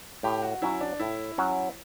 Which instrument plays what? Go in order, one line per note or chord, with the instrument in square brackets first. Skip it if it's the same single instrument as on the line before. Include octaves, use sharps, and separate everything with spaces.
[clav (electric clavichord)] A2 [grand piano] G4
[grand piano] F#4
[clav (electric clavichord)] F#3 C#4 F#4 [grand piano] E4
[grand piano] D4
[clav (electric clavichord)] A2 [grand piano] E4
[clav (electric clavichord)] F#3 C#4 F#4